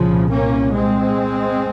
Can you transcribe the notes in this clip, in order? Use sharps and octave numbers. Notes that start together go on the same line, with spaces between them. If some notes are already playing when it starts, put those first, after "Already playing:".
Already playing: C2 A#2 C#3 F3
A#3 C#4
G#3 C4